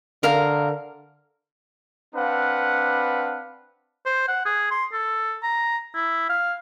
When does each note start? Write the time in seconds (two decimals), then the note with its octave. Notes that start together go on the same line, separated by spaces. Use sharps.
0.23 D3 A#4 F5 A#5
2.15 C4 D4 B4 F5 F#5
4.06 C5
4.28 F#5
4.45 G#4
4.71 C6
4.93 A4
5.43 A#5
5.95 E4
6.29 F5